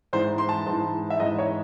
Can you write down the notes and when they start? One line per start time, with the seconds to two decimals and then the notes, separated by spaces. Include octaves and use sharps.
0.13 G#2 E3 C5
0.38 C6
0.49 A5
0.66 G#2
0.71 E3
1.10 E5
1.20 G#2 E3 D#5
1.38 C#5